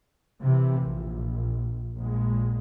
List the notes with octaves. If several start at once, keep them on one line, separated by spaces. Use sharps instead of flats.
C3 E3
A#1
A#1 G#3